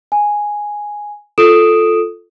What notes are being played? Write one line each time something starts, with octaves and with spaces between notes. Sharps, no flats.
G#5
F4 A4 D#6 D7 E7